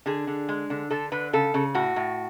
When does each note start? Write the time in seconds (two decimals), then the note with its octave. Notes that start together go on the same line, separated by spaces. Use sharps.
0.06 D3 G#4
0.27 D3
0.49 G#3
0.70 D3
0.91 D3 A4
1.12 D3 B4
1.33 C#3 A4
1.54 C#3
1.75 A2 F#4
1.96 A2